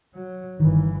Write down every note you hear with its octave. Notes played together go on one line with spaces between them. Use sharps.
F#3
G1 D#3 E3